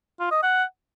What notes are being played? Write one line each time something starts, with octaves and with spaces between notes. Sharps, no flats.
F4
D#5
F#5